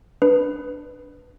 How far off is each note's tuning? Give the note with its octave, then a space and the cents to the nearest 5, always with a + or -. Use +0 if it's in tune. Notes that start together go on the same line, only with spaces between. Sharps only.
D4 +0 B4 +0